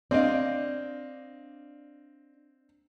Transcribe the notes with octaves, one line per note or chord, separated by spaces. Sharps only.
C4 D4 D5 D#5 F5